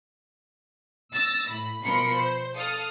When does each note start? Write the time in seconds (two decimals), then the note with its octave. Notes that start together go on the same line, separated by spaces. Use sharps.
1.13 E6 A6 A#6
1.50 A2 B5
1.83 B2 F3 A#4 B5 C6 C#7
2.16 C5
2.56 A4 F5 D#6 F6